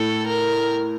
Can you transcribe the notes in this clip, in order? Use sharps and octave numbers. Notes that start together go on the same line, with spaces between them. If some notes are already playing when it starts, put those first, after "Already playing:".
Already playing: A2 A4
A#4